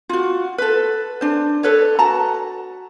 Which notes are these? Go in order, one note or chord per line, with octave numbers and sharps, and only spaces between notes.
F4 F#4
A4 B4
D4 C5
A4 B4 C#5
F#4 A5 A#5